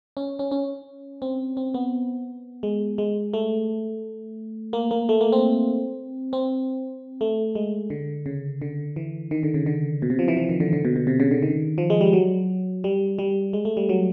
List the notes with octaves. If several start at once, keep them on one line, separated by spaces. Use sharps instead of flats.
C#4
C#4
C#4
C4
C4
B3
G#3
G#3
A3
A#3
A#3
A3
A#3
C4
C4
A3
G#3
D3
C#3
D3
E3
D#3
D3
C#3
D3
B2
C3
F3
E3
F3
D#3
D3
D3
B2
B2
C3
C#3
D3
D#3
F3
G#3
G3
F#3
G3
G3
G#3
A3
G3
F#3